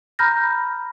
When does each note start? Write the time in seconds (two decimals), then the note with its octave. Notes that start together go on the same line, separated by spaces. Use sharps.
0.19 A#5 B5 F6 G6 A#6